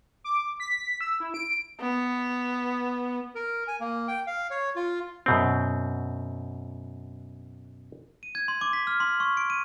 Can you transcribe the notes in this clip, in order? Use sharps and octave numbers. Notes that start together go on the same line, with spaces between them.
D6
B6
E6
E4
D7
B3
A#4
G#5
A#3
G5
F5
C#5
F4
F#2 B2 C4
D#7
G#6
C6
D6
B6
F6
C6
C#6
D7
D#7